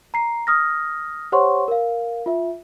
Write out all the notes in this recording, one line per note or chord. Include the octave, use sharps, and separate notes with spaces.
A#5 C7
D#6 F6 A#6
G4 C5 C#5 F#5 C6 C#6
A#4 F5
F4 E5